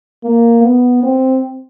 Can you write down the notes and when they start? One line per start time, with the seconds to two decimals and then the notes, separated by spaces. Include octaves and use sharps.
0.24 A#3
0.63 B3
1.03 C4